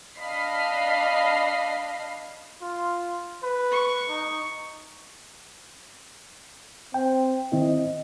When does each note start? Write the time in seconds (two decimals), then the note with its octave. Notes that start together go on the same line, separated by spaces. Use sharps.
0.17 D4 D#5 F5 B5 C7
2.62 F4
3.43 B4
3.72 C#6
4.09 D#4
6.94 C4 G5
7.52 D#3 C4 E4 D#5